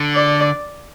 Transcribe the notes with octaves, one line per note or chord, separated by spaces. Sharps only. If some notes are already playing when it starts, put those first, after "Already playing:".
Already playing: D3
D5